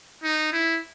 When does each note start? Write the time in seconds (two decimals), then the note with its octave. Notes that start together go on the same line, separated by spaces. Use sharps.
0.23 D#4
0.52 E4